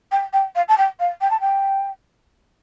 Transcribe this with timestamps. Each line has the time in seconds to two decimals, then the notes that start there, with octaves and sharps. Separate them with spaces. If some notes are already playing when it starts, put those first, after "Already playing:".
0.11 G5
0.33 G5
0.55 F5
0.68 A5
0.78 G5
0.99 F5
1.21 G5
1.30 A5
1.40 G5